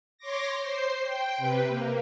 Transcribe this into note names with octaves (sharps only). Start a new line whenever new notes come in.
C#5 C6 D6 A#6
C5 C7
G5
C3 B4
A#3